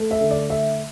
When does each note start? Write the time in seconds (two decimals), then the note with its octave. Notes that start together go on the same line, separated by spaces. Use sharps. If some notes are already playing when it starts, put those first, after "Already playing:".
Already playing: A3
0.11 E5
0.21 D3
0.31 D5
0.50 A3 E5